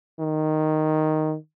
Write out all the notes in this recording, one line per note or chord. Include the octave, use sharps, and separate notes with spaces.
D#3